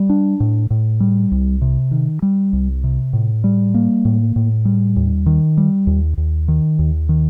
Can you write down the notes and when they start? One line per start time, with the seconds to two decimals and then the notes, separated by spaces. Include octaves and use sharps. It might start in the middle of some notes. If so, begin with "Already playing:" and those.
Already playing: G3
0.10 D4
0.40 A2
0.70 A2
1.00 G3
1.32 C2
1.61 C3
1.91 D#3
2.22 G3
2.53 C2
2.84 C3
3.13 A2
3.44 G3
3.74 A#3
4.05 A2
4.36 A2
4.65 G3
4.96 D#2
5.26 D#3
5.57 G3
5.87 D#2
6.17 D#2
6.48 D#3
6.79 D#2
7.09 D#3